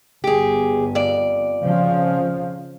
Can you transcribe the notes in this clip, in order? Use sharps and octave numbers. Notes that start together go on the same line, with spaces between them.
G1 G4 G#4
F2 D5
C#3 F3